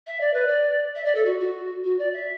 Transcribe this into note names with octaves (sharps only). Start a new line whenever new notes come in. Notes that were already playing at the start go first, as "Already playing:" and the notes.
E5
D5
B4
D5
E5
D5
A4
F#4
F#4
F#4
D5
E5